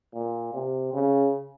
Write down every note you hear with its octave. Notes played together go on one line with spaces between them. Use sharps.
A#2
C3
C#3